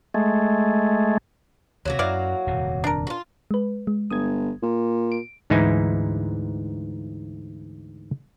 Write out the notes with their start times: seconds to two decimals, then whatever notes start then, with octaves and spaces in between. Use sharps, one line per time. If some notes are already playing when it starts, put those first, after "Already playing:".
0.14 G#3 A3
1.85 D2 C3 F#3 A#3 F#4
1.99 F#2 E4 D5 F5
2.47 D#1 F2 C3
2.84 D4 A#4
3.07 F4 F#4
3.51 G#3 B4
3.87 G#3
4.11 G1 D#6 G#6
4.63 A#2
5.12 D7
5.50 D2 G#2 E3 D#4 E4 G#5